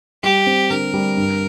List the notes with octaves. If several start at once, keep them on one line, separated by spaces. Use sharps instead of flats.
G3 G4
C4
D3 A#4
G3
G2